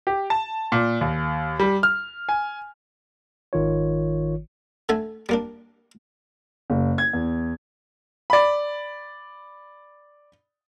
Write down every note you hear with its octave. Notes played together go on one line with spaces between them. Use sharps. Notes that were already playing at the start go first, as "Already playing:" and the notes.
G4
A5
A#2
D#2
G3
F6
G#5
G#1 D#3 F4 C#5
D3 A3 E5 G#5
G3 A#3 D4
F#1
G#6
E2
D5 B5